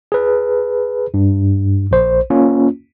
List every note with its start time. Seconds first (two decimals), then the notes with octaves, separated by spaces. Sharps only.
0.12 G#4 B4
1.14 G2
1.91 A#1 C5
2.30 A#3 C#4 F4